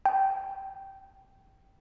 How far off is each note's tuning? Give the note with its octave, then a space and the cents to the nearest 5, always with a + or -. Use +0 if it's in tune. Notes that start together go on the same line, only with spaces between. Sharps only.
G5 -15